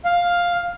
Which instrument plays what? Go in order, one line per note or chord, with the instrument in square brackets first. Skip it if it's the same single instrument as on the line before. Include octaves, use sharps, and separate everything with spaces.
[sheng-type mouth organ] F5